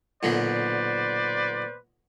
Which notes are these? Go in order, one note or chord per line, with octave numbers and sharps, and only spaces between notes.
B1 A#2 D3 B4 C5 D5